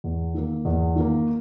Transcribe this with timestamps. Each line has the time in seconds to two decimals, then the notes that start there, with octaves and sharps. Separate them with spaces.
0.04 E2
0.34 D#3 A#3
0.65 E2
0.96 D#3 A#3